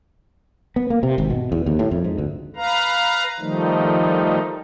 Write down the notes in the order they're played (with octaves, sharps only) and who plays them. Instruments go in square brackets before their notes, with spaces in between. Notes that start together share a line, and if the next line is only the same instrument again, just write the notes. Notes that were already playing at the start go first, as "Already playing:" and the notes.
[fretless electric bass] B3
A#3
C3
G#1
B2
E2
D#2
A2
F2
G#2
D2
[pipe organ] B4 F5 A#5
D#3 F3 G3 A3 D#4